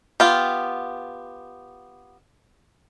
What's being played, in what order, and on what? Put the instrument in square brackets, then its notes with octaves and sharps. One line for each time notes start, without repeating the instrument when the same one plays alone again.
[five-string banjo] B3 F4 G4